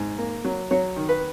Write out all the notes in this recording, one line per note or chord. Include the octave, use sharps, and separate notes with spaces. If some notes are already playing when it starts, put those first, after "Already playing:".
Already playing: G#2
A#3
F#3
F#3 C#5
D#3
B4